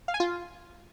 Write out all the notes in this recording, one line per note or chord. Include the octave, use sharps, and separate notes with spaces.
F5
G#5
F4